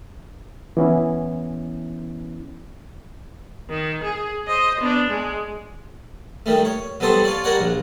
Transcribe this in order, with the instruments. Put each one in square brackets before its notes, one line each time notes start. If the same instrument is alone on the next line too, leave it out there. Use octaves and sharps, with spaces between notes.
[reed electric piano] E3 B3 C#4 E4
[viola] D#3
G#4
C5 D#5
B3 D4
G#3
[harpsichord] D#3 G3 A3
C#5
F#3 G3 B3 A4 C5
F4 C#5 D5
G3 A#4 C#5 D5 F#5
A#1